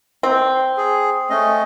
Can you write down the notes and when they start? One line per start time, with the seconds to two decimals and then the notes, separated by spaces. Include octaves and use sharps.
0.23 C4
0.77 G#4
1.30 A3 C#4 D#5